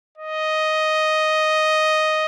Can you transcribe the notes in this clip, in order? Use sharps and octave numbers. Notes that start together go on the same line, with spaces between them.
D#5